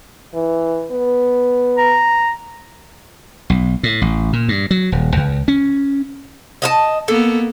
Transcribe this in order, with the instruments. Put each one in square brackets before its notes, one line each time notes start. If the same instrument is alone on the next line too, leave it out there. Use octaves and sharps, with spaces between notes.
[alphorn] E3
B3
[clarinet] A#5
[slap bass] B1
A2
A1
A#2
G2
F#3
D#1
C#2
C#4
[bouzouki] D#5 F5 A5
[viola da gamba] A#3 B3 [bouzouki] A4